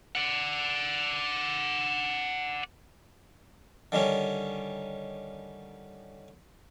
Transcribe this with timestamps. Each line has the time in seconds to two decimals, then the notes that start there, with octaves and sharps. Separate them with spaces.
0.15 D5 F#5
3.92 D3 D#3 G3 C#4